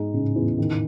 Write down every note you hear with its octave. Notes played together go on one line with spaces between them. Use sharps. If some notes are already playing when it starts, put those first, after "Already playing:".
Already playing: G#2 G#3 D#4
A2 C#3
E2
D#3